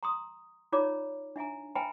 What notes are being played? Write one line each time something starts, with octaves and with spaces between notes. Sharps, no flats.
A#5 C6 D#6
D#4 F4 C#5 D5 A#5 D6
D4 E5 G#5 A#5
B4 E5 G5 G#5 A#5 B5